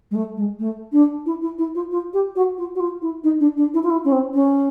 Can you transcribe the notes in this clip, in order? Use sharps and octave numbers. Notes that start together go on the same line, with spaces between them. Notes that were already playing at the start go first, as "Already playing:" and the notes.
G#3
A3
G#3
A3
D4
E4
E4
E4
F4
F4
G4
F#4
F4
F#4
F4
E4
D#4
D4
D4
E4
F4
E4
C#4
C4
C#4